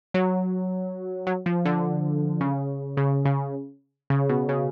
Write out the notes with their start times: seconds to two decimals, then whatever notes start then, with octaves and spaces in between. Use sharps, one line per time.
0.14 F#3
1.27 F#3
1.46 F3
1.65 D3
2.41 C#3
2.97 C#3
3.25 C#3
4.10 C#3
4.29 B2
4.49 C#3